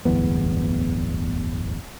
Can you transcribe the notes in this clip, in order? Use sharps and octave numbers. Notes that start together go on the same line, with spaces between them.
D1 G1 E2 B3